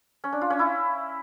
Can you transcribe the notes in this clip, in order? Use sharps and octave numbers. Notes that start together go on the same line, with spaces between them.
C#4
D4
F4
C#4
E4